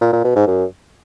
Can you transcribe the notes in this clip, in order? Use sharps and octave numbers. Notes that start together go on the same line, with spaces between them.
A#2
A#2
B2
G#2
F#2